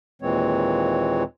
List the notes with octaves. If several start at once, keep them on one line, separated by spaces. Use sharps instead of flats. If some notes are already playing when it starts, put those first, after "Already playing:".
D#2 A#2 E3 G#3 C4 C#5